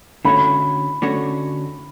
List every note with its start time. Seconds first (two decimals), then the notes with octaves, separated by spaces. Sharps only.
0.25 D3 A3 C#4 F#4 C#5 B5
1.02 D3 A3 C#4 F#4 C#5